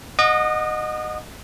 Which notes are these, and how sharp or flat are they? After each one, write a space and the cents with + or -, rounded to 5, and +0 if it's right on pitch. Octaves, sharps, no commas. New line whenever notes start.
D#5 -15 F#5 -20 D#6 -40